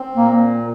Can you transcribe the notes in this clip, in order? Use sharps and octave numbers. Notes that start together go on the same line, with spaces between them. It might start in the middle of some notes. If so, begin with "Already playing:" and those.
Already playing: C4
A#2 A#3